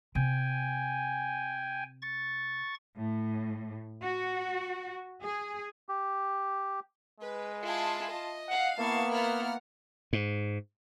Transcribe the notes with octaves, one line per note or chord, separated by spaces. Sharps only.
C3 G5 G#5
C#6 A6
A2
F#4
G#4
G4
G#3 B4
E4 F4 G#4 A5
D#5
F5 F#5
A#3 B3 E4 A5 C#6
E4 F4 A#4 F#5 F6
G#2